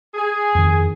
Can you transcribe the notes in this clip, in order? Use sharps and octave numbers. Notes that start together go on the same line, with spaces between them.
G#4
F2 D#3